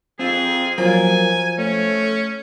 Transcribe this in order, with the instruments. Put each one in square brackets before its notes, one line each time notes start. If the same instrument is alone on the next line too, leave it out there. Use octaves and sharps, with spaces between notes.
[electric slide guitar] C4 F4 [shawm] G#4
[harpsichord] F3 [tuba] F#3 [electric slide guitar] F4 A#4 [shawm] G#5
[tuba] A3 [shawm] C#4 [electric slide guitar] C#5